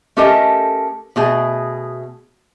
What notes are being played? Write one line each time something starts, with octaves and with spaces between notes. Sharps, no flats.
A3 C#4 G4 A4 A#4 D#5
B2 A3 G#4